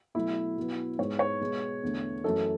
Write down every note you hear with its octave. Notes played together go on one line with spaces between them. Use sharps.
B2 F#3 A3 E4
B2 F#3 B3
G#2 G#3 B3 C#5
C#5
B2 G#3 B3
E2 D3 A3
F#2 E3 A3 A4